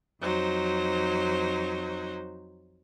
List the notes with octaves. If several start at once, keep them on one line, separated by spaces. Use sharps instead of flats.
F2 F#3 D#4 C5